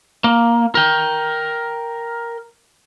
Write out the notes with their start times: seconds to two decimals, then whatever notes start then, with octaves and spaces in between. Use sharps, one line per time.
0.24 A#3
0.75 A#4 G5